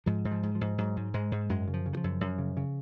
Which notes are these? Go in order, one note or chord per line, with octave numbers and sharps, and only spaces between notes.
G#2 F3
G#2
F3
G#2
F3
G#2
G#2 F#3
G#2
G#2 G#3
G#2
F#2 G#3
C#3
F3
C#3
D#3
F3
F#2
F#2
C#3
C#3